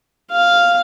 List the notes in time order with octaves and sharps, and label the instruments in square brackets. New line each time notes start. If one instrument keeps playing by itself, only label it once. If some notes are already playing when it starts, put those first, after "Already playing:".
[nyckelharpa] F5